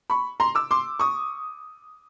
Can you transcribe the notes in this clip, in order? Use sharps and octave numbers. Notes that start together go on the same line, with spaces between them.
B5 C#6
A#5 C6
D6 E6
C6 D6
C#6 D#6